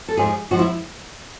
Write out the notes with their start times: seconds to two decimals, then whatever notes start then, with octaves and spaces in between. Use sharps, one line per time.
0.08 A4
0.17 G#2 F3 G#4
0.51 G#2 F3 F#4
0.59 E4